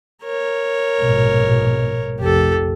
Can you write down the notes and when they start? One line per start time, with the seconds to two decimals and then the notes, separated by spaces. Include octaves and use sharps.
0.23 A#4 C#5
1.00 A#1 G#2 B2
2.19 F1 A#1 G4 A4